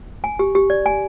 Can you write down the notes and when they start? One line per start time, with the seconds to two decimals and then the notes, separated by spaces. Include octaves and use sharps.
0.24 G#5
0.39 G4
0.55 G4
0.70 D5
0.86 G#5